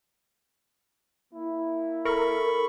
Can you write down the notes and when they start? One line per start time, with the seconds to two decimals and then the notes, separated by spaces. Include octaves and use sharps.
1.33 A#3 E4
2.05 A4 A#4 B5 C#6